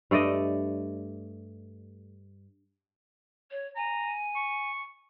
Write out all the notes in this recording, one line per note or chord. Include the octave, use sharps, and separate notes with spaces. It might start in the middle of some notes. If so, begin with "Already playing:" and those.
G2 A3 D5 D#5
C#5
G#5 A#5
C#6